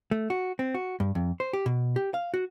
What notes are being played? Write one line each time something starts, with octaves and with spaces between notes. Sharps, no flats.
A3
F#4
C4
F#4
G2
F2
C5
G4
B2
G4
F5
F#4